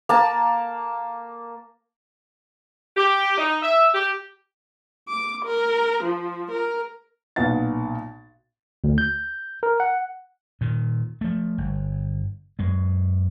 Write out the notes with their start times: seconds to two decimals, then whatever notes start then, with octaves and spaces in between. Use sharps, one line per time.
0.09 A#3 A5
2.97 G4
3.38 D#4
3.63 E5
3.95 G4
5.08 D6
5.45 A#4
6.03 F3
6.51 A#4
7.36 B1 A#2 B3 F5 F#5 A6
8.84 D2
8.98 G6
9.63 A#4
9.80 F#5
10.61 A#2 D#3
11.21 F3 A3
11.58 G1
12.59 F#2 G#3